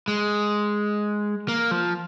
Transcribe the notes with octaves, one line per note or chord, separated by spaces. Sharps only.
G#3
A#3
F3